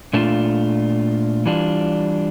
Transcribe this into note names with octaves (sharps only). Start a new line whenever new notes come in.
A#2 A3 D4 F4
E3 G3 D4 F4